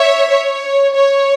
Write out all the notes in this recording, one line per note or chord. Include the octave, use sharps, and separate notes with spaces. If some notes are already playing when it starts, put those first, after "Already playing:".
Already playing: C#5 E5
C#5
C#5